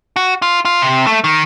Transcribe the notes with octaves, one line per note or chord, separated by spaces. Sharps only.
F#4
F4
F4
C3
A3
D#3